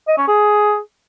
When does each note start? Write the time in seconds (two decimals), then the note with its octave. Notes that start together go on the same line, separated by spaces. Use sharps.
0.08 D#5
0.18 C#4
0.28 G#4